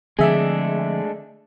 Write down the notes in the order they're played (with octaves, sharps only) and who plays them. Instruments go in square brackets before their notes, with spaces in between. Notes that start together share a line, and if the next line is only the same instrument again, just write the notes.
[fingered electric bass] D3 F3 C4 [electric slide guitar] G#3 A3 D4 [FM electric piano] G#4 E5